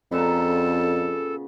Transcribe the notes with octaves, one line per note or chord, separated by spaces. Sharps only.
F2 A#2 C#3 B3 A4